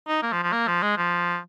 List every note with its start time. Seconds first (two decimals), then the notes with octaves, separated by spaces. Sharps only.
0.08 D#4
0.23 A#3
0.32 F3
0.43 F3
0.52 A#3
0.68 F3
0.83 G#3
0.97 F3